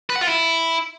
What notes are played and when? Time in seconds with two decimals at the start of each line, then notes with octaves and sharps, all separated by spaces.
0.10 B4
0.16 F#5
0.21 F4
0.27 E4